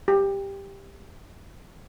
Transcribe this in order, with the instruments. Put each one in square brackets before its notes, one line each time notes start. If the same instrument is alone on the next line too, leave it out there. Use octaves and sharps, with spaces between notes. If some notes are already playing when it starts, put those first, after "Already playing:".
[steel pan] G4